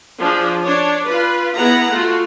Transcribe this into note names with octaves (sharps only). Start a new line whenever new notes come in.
F3 D4 G#4
D4 C#5
F4 B4
B3 E4 G#4 F#5 A#5
A3 F4 F#4